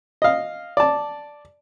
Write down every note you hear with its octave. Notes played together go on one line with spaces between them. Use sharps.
D#5 F5
D5 A5